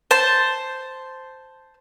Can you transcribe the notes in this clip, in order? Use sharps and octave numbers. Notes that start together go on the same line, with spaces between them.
C5 A5